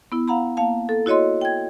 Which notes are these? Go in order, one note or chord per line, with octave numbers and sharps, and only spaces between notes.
B3 E4
F5 F#5 A#5 B5
A#3 F5 A5
A4
E4 F#4 C#5 D#5 C6
G5 G#6